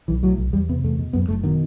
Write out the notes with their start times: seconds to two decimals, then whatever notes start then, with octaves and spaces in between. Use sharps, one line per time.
0.08 B1 E3
0.23 A2 F#3
0.38 B1
0.53 E2 G3
0.69 C3 B3
0.84 E2 A3
0.99 B2
1.13 F#2 B3
1.28 F#1 A3
1.43 B2 D#3